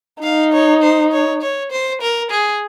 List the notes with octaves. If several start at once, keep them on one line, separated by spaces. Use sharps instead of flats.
D#4 F5
C#5
C5
C#5
C#5
C5
A#4
G#4